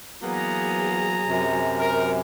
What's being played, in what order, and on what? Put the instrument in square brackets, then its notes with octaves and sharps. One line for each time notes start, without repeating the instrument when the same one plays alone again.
[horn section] E3 A#3 B3 [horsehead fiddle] F#3 G#4 [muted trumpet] A#5
[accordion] F#2 C3
[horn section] A#4